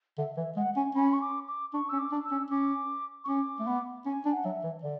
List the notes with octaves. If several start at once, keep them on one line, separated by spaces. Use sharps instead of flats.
D3 E5
E3 E5
G#3 F#5
C#4 G#5
C#4 B5
C#6
D6
D6
D4 C#6
C#4 E6
D6
D4
E6
C#4
C#4 D6
C#6
C#4 D6
A3
B3
C#4 G#5
D4
F#5
F#3 E5
E3
D3 D5